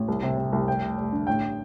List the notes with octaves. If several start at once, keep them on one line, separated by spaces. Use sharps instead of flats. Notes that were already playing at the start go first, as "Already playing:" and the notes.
Already playing: A1
C2
C3
C3
C2
F1 G5
F1
F1
D3
A1 G5